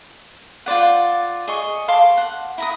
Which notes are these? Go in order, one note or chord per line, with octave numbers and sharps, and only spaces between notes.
F4 C5 D5 F#5
G#4 D#5 C#6
F5 A5 C6 D6
F#5
E4 A#5 D#6